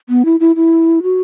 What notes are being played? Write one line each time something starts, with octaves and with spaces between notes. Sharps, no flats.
B3
E4
E4
E4
F#4